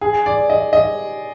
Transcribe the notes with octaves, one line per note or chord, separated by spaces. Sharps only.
G#4
D5
D#5
D#5